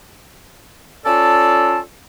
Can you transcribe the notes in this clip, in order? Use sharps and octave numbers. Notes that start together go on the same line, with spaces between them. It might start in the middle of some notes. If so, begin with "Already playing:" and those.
C#4 F4 A4 D5 A5